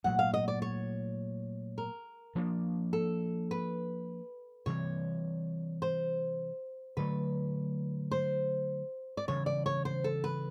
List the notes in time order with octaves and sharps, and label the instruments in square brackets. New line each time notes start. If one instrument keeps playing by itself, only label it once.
[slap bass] A#2 F#3 A3 [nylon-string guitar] F#5
[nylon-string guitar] F5
D#5
D5
C#5
A#4
[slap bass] F3 A#3 D4
[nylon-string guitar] A4
B4
[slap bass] C3 E3 G3 C4 [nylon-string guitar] C#5
[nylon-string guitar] C5
[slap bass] D3 F#3 A3 [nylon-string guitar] B4
[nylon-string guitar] C5
D5
[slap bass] C#3 E3 G3 [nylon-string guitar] C#5
[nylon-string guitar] D5
C#5
C5
A4
B4